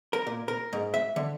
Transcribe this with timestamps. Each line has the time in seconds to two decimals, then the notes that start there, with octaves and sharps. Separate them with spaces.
0.13 A#4
0.27 A#2
0.48 A#4
0.73 G#2
0.94 E5
1.16 D3